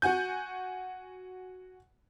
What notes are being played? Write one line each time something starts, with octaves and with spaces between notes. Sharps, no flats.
F#4 F#5 G#5 G6